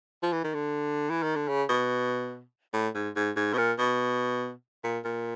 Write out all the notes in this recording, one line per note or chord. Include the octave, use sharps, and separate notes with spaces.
F3
E3
D#3
D3
E3
D#3
D3
C#3
B2
A2
G#2
G#2
G#2
B2
A#2
B2
A#2
A#2